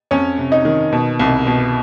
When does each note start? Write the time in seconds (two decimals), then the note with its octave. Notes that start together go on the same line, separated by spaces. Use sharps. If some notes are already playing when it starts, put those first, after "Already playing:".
0.11 F2 C#4 C#5
0.38 C3
0.52 D#4 D#5
0.65 D#3
0.92 B2
1.19 C2
1.47 B2